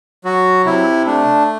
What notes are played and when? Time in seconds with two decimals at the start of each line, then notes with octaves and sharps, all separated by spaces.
0.24 F#3 F#4
0.65 C3 E4
1.07 A3 D4